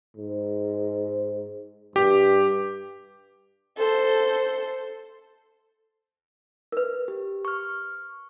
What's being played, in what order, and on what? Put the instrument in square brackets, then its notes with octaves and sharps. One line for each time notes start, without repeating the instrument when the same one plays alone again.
[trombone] G#2
[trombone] G2 [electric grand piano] G4
[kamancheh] A4 C5
[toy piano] A#4 B4
[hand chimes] G4
C#6 F6